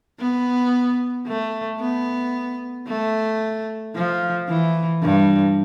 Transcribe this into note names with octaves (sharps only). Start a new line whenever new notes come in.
B3
A3
B3
A3
F3
E3
G2